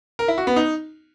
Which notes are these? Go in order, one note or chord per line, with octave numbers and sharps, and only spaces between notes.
A#4
E4
F#4
B3
D#4